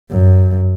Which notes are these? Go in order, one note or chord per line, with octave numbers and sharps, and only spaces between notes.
F#2